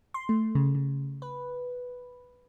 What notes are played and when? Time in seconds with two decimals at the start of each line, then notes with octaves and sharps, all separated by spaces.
0.14 C6
0.29 A3
0.55 C#3
0.75 C#3
1.22 B4